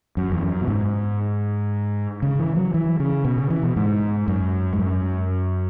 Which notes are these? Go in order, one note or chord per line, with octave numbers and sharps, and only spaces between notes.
F#2
E2
F#2
B2
G#2
C#3
E3
F#3
E3
C#3
B2
C#3
E3
B2
G#2
F#2
G#2
F#2